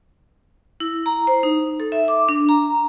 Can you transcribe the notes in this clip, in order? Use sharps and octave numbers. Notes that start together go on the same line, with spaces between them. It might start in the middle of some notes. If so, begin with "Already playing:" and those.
E4
A#5
C5
D#4
A4
E5
D6
D4
A#5